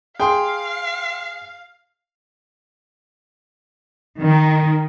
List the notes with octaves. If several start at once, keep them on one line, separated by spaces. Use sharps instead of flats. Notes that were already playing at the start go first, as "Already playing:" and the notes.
G#4 F5 G5 C6
D#3